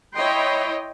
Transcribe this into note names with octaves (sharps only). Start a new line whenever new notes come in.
E4 C#5 D#5 G5 C6